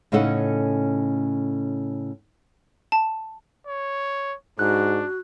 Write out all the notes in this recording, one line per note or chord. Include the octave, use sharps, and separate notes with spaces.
A2 C#3 C#4 D#4 A4 F#5
A5
C#5
G#2 D4 F#4 F#6